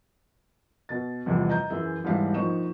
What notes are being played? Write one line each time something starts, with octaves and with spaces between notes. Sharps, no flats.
B2 A6
A1 E2 C3 F3 G3
D#5 A#5 G6
F#2 E3 G#4 E5
E1 G#2 E3 G3 F5 B6
A#1 D#4 C5 C#6 E7